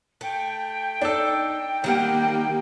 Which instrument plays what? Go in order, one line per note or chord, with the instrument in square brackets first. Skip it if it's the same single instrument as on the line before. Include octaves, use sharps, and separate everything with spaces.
[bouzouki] A3 [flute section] G5
[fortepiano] D4 A4 [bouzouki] D#4
[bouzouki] D#3 G3 F#5 [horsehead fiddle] A#3 G4 [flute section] G5